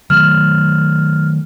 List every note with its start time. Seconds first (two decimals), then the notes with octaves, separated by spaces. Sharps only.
0.10 D#3 F#3 A3 F6